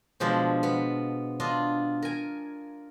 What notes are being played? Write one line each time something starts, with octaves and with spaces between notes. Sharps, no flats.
B2 F3 G#3 D4 F4
B3
D4 F4 D#5
A#4 G#5